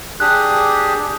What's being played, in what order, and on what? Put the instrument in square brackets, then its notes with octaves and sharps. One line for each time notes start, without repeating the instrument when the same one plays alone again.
[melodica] D4 G4 G#4 [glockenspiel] F#6